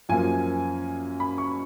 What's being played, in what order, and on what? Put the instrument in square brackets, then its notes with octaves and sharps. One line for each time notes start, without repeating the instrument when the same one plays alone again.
[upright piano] F#2 F3 A#3 G#5
B5
C#6